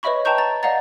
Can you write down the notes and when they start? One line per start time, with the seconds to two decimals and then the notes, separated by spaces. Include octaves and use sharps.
0.03 B4 C#5 D#5 E5 B5 C#6
0.25 B4 G5 A5 A#5 C#6 G6
0.38 A#5 A6
0.63 D5 D#5 F5 F#5 A#5 A6